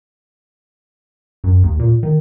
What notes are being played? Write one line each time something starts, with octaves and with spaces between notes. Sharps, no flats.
F#2
D#2
A#2
D#3